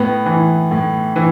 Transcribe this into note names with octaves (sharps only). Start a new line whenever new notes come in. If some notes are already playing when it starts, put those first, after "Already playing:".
Already playing: A2 B3
E3
A2
E3